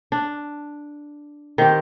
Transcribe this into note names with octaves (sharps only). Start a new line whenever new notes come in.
D4
D#3 C4 G4